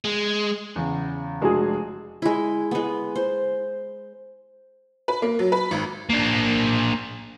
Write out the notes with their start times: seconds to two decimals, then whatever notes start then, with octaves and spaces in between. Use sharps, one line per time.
0.05 G#3
0.76 E2 C#3
1.42 F1 G#3 D4 F#4 G#4
2.22 G#3 E4
2.71 G#3 B3
3.16 C5
5.08 B4
5.22 A#3
5.39 F#3
5.52 B4
5.71 G#1
6.10 A#3 D4